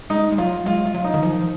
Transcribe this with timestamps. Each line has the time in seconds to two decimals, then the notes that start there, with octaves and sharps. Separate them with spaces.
0.10 G#3 D#4
0.32 G#3
0.38 F#3 F4
0.66 G#3 F4
0.85 F4
0.94 F#3
1.04 D#4
1.14 D#3
1.23 F3